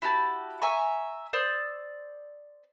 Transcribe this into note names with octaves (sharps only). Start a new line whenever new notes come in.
E4 F#4 G4 A5
E5 G#5 A#5 C#6
C5 D5 D#6 E6